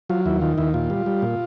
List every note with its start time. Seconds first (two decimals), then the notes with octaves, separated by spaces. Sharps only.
0.10 F#3 F4
0.26 D#2 E4
0.42 D#3 F4
0.58 D#2 E4
0.74 A#2 F4
0.90 G3
1.06 G3
1.22 A#2